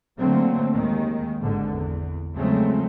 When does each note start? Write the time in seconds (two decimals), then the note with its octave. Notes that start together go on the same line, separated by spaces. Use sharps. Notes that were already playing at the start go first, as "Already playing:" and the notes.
0.19 D3 F#3 A3 A#3 C4
0.73 D#2 D#3 G#3
1.41 G#1 G#2 D3
1.74 E2
2.35 C#3 F3 F#3 G#3 A3 C4